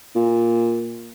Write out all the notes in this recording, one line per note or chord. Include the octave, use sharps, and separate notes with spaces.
A#2